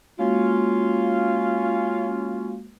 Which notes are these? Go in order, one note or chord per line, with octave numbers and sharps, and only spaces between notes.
G#3 A#3 C#4 F4 F#4